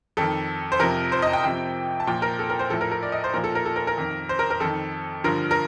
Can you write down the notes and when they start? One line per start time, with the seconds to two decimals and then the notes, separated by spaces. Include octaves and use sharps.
0.17 F2 D#3 A4
0.72 C5
0.79 F2 C3 F3 A#4
1.12 C5
1.22 D#5
1.33 G5
1.44 F2 C3 F3 G5
2.00 A5
2.07 A#2 F3 G5
2.22 A#4
2.39 A4
2.50 A#4
2.59 C5
2.70 A2 F3 A4
2.81 A#4
2.91 A#4
3.03 D5
3.12 D#5
3.24 C5
3.34 A#2 F3 A#4
3.44 A4
3.55 A#4
3.66 A4
3.76 A#4
3.87 A#4
3.97 F2 D#3
4.29 C5
4.39 A#4
4.50 A#4
4.60 F2 D#3 A4
5.24 G2 D3 F3 A#4
5.51 A#4